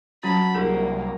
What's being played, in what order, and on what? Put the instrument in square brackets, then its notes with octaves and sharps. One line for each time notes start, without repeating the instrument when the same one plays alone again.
[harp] F#3 [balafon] C#4 F#4 [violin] A5 B5
[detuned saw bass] C2 [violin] A#3 [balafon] D4 G#4 A#4